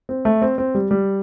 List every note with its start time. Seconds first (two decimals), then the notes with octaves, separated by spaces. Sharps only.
0.09 C4
0.25 A3
0.42 C4
0.58 C4
0.75 G3
0.91 G3